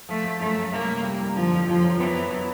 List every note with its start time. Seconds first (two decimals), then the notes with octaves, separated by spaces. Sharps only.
0.09 F3 A3
0.24 F3
0.40 F#2 A3
0.56 F#2
0.71 C2 A#3
0.88 C2
1.04 G3
1.19 C2
1.35 D3 F3
1.51 F2
1.67 F2 F3
1.83 F#3
1.99 E3 B3
2.15 B3
2.30 F#3